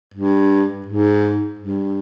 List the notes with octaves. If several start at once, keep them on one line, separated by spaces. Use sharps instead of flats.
G2
G#2
G2